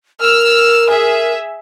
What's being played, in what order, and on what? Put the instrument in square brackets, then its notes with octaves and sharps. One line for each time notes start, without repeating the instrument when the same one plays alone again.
[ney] A#4 [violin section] E6 F6
[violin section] G#4 E5